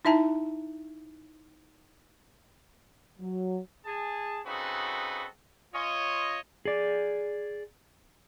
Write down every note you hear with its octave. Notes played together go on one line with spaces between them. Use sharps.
D#4 E4 E5 A5 A#5
F#3
G#4 A5
C#3 C4 D#4 F#4 A4 B4
F4 C#5 D#5
G#4 D5